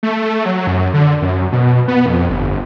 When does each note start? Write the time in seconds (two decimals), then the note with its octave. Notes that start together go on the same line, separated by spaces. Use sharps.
0.03 A3
0.45 F#3
0.67 F#2
0.94 D3
1.22 F#2
1.52 B2
1.88 B3
2.06 F2
2.30 G1